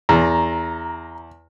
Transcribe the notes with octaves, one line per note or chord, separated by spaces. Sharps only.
E2 A#5